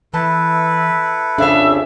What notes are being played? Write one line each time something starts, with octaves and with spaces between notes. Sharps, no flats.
E3 E4 A4 B4 A5
C2 F2 C#3 D4 E5 F5